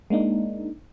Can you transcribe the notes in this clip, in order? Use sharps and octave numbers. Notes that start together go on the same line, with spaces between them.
G#3 A#3 D4 D#4